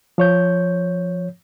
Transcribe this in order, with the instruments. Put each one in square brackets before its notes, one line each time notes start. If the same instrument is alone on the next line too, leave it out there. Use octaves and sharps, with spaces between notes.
[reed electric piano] F3 C#5 G6